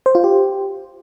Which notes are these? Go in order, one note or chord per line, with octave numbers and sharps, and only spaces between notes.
C5
F4
G4